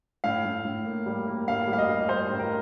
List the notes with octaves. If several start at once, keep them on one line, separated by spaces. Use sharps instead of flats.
A2 F5
A2
A2
A#3
G3
A#3
A2 F5
G3
F5
D#5
G3
G3 C5
A2
A#4